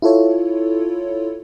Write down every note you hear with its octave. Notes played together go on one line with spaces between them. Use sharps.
E4 F4 A4 C#5